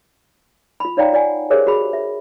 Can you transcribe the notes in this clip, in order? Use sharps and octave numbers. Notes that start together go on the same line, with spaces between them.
F4 B5
D#4 C#5 D5 F5 G5 A#5
F4 D5 F#5 G#5
G4 G#4 A#4 C5 C#5 E5
F#4 G#4 B5
E5